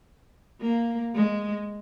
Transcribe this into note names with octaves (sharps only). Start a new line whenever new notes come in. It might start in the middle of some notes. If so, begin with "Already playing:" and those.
A#3
G#3